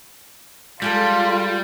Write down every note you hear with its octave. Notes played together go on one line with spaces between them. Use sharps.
G3 G#3 F4 G#4 A4